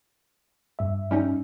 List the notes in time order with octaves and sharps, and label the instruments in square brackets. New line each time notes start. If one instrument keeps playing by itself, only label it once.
[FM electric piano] G2 E5
[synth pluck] G3 C#4 D#4